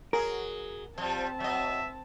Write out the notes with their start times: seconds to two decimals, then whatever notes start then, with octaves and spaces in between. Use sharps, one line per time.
0.13 F#3 G#4 A#4
0.98 F3 G3 C4 A5
1.40 F#3 D#5 E5